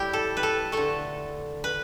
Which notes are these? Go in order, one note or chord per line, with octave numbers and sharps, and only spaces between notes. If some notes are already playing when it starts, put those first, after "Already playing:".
Already playing: A2 G3 E4 G4
A4
B4
A4
D3 A3 A4
B4